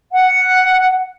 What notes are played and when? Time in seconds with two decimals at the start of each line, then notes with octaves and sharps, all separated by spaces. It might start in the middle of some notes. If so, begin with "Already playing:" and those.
0.12 F#5